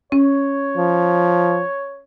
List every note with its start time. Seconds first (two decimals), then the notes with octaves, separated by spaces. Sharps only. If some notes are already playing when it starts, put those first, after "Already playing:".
0.12 C#4 C#5
0.77 F3